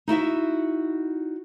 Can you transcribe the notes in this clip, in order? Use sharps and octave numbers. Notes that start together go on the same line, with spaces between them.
D#4 E4 F#4 E5